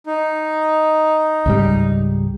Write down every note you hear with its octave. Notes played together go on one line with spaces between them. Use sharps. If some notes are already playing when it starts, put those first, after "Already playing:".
D#4
C#2 G#2 G3